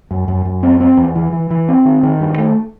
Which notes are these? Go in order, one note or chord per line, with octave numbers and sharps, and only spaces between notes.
F#2
F#2
F#2
C4
C4
E2
E3
E3
E3
C4
D#3
D#3
G2
A3